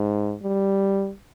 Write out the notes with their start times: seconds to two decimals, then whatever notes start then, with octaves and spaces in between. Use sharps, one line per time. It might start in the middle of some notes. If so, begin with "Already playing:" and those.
Already playing: G#2
0.43 G3